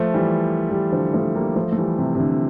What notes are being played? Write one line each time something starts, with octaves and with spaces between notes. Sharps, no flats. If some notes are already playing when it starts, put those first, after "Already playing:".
Already playing: F3 A3
E3 G3
E3 G3
D3 F3
F3 A3
G3 A#3
F3 A3
A3
E3 G3
C3
C3
D3